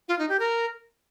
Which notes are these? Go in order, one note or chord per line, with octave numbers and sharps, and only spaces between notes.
F4
D#4
G4
A#4